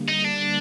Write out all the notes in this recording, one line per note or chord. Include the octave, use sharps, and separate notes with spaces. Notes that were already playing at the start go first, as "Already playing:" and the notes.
Already playing: D3 G3 A#3
D#4
D4